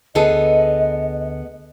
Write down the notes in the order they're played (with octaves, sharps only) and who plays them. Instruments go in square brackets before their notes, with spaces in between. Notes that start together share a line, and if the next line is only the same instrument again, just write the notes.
[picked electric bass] D2 [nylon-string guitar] B3 G#4 A4 [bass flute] D#5